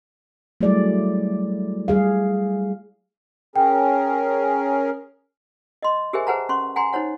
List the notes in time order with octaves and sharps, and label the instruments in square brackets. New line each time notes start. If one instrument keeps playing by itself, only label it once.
[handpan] F#3 G3 A3 E4 G#4 D5
G3 G#4 F5
[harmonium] C#4 G#4 A#4 [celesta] G5
[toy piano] D#5 C6
G4 G#4 A#4 C5 E5 G#5
G#4 B4 C5 F#5 A5 A#5
C#4 C6 C#6
F#5 G#5 A#5 C6
D#4 C5 C#5 F#5